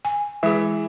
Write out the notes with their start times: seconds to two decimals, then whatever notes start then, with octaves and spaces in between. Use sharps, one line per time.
0.05 G#5
0.43 E3 G#3 G#4 E5